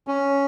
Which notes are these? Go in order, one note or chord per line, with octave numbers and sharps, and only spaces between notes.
C#4